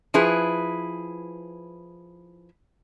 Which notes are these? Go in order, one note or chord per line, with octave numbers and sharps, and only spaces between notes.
F3 E4 G#4 B4